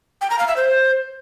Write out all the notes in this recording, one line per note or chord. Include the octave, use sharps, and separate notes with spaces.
G5
A#5
F5
E5
C5